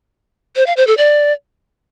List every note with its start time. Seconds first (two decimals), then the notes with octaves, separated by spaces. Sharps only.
0.56 C5
0.66 F5
0.77 C5
0.87 A4
0.97 D5